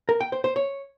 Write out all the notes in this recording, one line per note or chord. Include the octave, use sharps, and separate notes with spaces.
A#4
G5
C5
C5
C#5